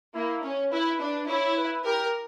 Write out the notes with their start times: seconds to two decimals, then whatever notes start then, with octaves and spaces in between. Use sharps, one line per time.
0.15 A#3 E4
0.43 C#4
0.72 E4 B4
1.00 D4
1.28 E4 C#5
1.57 B4
1.85 G4 A#4